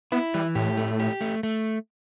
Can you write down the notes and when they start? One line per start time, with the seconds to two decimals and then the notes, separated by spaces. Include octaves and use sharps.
0.12 B3 E4
0.34 E3 G3
0.55 A2 G4
0.77 A3
1.00 G4
1.21 A3
1.43 A3